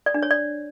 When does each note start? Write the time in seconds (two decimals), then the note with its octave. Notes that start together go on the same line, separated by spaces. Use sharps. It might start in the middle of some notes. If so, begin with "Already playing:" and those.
0.06 D5
0.14 D4
0.23 C#5
0.31 D5